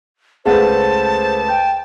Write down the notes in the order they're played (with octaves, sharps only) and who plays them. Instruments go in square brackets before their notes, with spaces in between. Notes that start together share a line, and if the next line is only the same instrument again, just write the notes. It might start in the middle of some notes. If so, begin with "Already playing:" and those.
[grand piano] C#2 A3 B4 [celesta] G#4 F#5 [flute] C5 [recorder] A5
[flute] G5 [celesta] G6